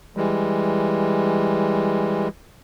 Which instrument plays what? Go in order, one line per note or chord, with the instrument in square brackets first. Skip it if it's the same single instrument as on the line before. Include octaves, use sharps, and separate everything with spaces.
[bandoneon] E3 G3 G#3